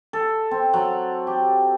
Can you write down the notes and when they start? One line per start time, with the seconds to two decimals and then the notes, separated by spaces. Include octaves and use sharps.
0.13 A4
0.51 C4
0.73 F#3
1.27 G4